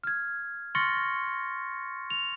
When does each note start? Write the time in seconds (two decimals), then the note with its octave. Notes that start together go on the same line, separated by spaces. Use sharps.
0.04 F6 G#6
0.75 C6 C#6 F6 A6 A#6 C#7
2.10 F7